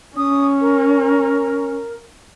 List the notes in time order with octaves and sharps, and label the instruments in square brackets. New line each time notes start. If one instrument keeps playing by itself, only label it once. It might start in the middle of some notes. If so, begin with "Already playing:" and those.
[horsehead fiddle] C#4 [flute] D#6
[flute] A#4